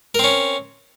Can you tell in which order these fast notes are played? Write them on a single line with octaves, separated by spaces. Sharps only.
A#4 C4 C#4